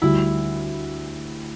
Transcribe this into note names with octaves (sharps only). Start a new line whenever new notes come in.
D2 D3 G3 E4